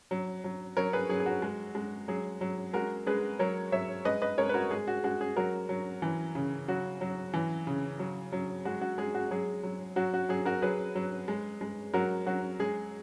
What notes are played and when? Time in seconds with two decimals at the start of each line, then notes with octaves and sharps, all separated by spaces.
0.11 F#3
0.44 F#3
0.77 F#3 A#4 C#5
0.93 G#4 B4
1.09 F#3 G#4
1.20 G#4
1.26 F#4
1.42 G#3
1.75 G#3
2.08 F#3 G#4
2.41 F#3
2.73 G#3 F#4 A#4
3.07 G#3 G#4 B4
3.39 F#3 A#4 C#5
3.72 F#3 C#5 E5
4.05 G#3 B4 D#5
4.22 B4 D#5
4.38 G#3 A#4 C#5
4.49 B4
4.54 F#4 A#4
4.71 G#3 G#4
4.87 F#4
5.04 G#3 F#4
5.21 G#4
5.37 F#3 F#4 A#4
5.69 F#3
6.02 E3
6.35 C#3
6.68 F#3 F#4
7.01 F#3
7.34 E3
7.67 C#3
7.99 F#3
8.32 F#3
8.65 G#3 F#4
8.81 F#4
8.98 G#3 G#4
9.15 F#4
9.31 F#3 G#4
9.63 F#3
9.96 F#3 F#4
10.14 F#4
10.29 F#3 G#4
10.45 F#4 A#4
10.62 F#3 G#4 B4
10.95 F#3
11.28 G#3
11.61 G#3
11.94 F#3 F#4 A#4
12.26 F#3 F#4
12.60 G#3 G#4